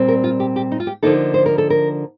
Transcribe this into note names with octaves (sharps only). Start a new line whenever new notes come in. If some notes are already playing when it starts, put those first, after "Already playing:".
Already playing: A#2 G3 C4
A#4
F4
G4
G4
D#4
F4
G4
D3 F3 A#3 D#4 A4
C5
A#4
A4
A#4